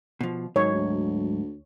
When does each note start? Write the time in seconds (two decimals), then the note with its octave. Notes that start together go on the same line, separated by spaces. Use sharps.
0.21 B2 F3
0.56 G#2 D#3 F#3 C#5
0.74 D2